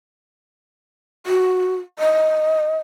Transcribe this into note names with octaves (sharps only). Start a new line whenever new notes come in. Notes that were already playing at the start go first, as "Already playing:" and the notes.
F#4
D#5